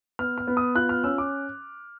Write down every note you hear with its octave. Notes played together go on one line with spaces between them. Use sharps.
B3 F6
F6
B3
D#6
F4 F#6
F6
C#4 E6
D6